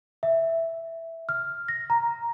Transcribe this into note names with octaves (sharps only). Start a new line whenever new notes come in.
E5
F6
A#6
A#5